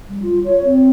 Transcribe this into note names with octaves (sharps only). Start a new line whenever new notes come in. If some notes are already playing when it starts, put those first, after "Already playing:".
G3
F4
C#5
C4